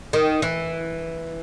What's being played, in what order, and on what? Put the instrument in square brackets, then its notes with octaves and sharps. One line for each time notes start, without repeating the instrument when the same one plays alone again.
[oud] D#3
E3